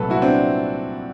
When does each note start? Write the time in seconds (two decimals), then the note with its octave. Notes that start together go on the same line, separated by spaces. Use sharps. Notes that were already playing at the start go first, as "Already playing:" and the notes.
Already playing: C2 A#2 F#3 A3 A4 B4
0.10 E4 F#4
0.22 C4 D4